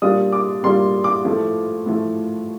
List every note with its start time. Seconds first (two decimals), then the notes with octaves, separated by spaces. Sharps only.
0.02 A#2 G3 D4 F4 D#6
0.32 D6
0.63 A#2 G3 D4 F4 C6
1.04 D6
1.25 A2 F3 A3
1.86 A2 F3 A3